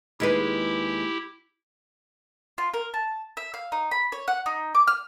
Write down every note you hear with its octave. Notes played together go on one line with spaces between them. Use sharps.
D#2 G#3 E4 G4 B4
F4
A#4
A5
E5
F5
D#4
B5
C#5
F#5
D#4
D6
F6